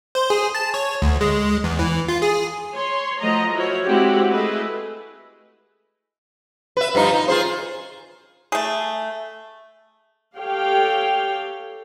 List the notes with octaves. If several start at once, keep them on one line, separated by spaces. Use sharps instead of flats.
C5
G#4
A5
C#5
D2
G#3
E2
E3
F4
G#4
C#5 C6
F3 F#3 A3 D#5 A#5
E4 F#4 A#4 C5 C#5
G#3 C4 E4 F#4 G4
A3 E4 G#4 B4 D#5
B4 E5
G2 F3 D#4
D#4
F4 G#4 C5
A3 G#4
G4 A4 C#5 F5 G5